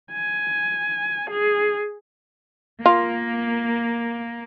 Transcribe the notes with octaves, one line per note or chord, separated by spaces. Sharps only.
G#5
G#4
A#3 F4